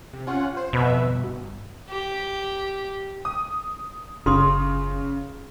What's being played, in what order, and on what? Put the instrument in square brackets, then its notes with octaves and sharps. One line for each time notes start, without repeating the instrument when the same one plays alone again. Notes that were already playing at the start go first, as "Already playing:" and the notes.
[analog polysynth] C3
C#4 F4 F#5
C5
[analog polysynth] F2 B4 E5 [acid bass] B2
[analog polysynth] G1
[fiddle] G4
[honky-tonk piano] D#6
[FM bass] F#1 [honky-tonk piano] C#3 [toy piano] F4 C6 D#6